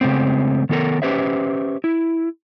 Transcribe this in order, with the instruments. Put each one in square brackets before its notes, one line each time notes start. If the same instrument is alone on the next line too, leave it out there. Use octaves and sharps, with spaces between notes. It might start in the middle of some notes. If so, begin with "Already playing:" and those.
[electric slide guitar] C#3 G#3 A3 B3 C4
D#3 B3 G4 A4 A#4
C#4 G4 B4 C5 E5
E4